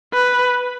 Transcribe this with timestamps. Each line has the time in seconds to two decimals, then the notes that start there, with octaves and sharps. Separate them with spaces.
0.13 B4